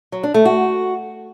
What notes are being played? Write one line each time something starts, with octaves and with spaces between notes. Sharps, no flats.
F#3
D4
A3
F#4